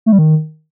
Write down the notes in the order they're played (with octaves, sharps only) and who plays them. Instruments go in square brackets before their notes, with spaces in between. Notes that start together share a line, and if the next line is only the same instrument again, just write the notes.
[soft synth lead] A3
G3
D#3